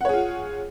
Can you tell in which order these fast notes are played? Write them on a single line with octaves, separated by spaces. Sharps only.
F#5 C#5 G#4 F4